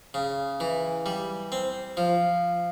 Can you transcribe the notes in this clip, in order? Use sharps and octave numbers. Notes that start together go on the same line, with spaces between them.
C#3
E3
G3
C4
F3